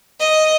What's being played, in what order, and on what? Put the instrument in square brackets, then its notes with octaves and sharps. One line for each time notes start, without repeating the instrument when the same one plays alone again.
[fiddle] D#5